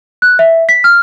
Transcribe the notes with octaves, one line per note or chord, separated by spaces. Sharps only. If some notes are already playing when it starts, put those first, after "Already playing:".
F#6
E5
B6
F6